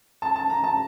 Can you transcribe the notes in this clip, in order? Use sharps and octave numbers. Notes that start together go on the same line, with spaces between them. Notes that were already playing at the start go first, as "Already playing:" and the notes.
A5
A5
A#5
A5